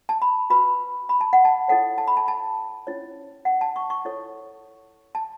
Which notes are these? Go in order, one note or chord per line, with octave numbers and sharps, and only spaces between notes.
A5
B5
F#4 B4 B5
B5
A5
F#5
A5
E4 A4 C#5 F#5
A5
B5
A5
A5
C#4 E4 C#5
F#5
A5
C#6
C#6
E4 A4 C#5
A5